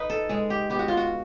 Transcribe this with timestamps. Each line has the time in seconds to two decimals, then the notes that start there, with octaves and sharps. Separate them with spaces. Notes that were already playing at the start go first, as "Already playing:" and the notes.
Already playing: D#4 B4
0.10 A4
0.29 G#3 G#4
0.50 G4
0.70 B3 G4
0.79 F#4
0.88 F4
0.97 F#4